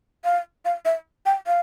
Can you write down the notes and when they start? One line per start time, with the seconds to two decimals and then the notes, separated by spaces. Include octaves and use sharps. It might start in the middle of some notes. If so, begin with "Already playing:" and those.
0.24 F5
0.65 F5
0.85 E5
1.26 G5
1.47 F5